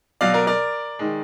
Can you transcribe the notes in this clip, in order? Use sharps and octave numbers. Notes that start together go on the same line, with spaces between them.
B2 F#3 D5 F5
A#4 D5
A#4 D5
D#3 G#3